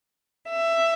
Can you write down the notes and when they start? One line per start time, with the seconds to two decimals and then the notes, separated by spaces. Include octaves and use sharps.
0.49 E5